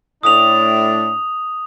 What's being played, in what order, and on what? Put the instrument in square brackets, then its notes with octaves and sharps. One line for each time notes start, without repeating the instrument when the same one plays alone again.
[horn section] A2 D4 [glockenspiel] D#6 F7